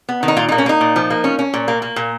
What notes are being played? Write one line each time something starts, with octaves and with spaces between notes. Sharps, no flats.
B3
D#3
D#4
A#2 F4
D#4
A#3
C#4
A#3 D#4
A#2
F3
A#3
C#4
C#4
A#2
A#3
A#3
A#2